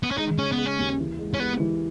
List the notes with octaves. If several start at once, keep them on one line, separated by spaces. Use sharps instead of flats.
B3
C#4
G#3 D#4
C#3 C#4
B3
G#3
C#4
D#2
E3
G#3
C#4
G#3 B3
E3